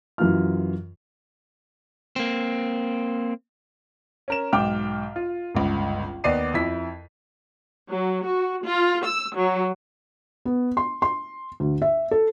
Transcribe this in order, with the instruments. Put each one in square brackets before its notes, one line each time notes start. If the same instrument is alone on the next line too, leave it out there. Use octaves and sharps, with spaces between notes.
[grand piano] F#2 E3 F4 F6
[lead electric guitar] A#3 C4
[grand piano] C#4 A#4 E7
B1 G#2 G5 D6 F6
F4
G1 C#2
D#2 B3 D5 C7 D#7
F2 E4 B6
[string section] F#3
F#4
F4
E6
F#3
[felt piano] B3
C6
C6
D2
E5
A4